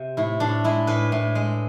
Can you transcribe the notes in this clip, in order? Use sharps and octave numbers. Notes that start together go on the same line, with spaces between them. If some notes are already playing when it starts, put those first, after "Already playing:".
Already playing: C3
A2 E4
A2 D4
G#3 E4
A2 B4
A2
G#3